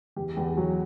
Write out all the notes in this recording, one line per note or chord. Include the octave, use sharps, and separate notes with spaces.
E2 G4
E2 G4
F#3